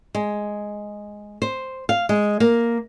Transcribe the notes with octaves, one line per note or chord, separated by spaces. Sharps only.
G#3
C5
F5
G#3
A#3